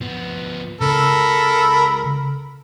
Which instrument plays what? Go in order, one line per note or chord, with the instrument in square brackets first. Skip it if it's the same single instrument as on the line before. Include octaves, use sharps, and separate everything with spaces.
[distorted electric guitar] F3 B3
[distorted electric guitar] C#2 C#3 [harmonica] A4 A#4 B5